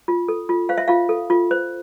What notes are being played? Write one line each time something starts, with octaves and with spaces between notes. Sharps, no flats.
F4
A4
F4
C5 F5
E5
F4 F5
A4
F4
C5